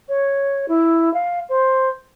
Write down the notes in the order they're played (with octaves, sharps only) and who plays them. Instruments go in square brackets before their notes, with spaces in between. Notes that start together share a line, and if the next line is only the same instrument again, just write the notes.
[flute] C#5
E4
F5
C5